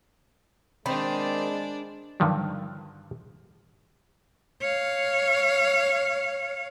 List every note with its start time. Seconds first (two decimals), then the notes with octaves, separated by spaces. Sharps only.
0.86 D#3 G#3 C4 D4 D#4 C5 D5 B5
2.20 G2 D3 D#3 F3 F#3
4.61 C#5 F5